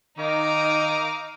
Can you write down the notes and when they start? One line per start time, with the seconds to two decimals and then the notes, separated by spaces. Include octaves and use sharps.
0.19 D#3 D#4 F5 A#5 D6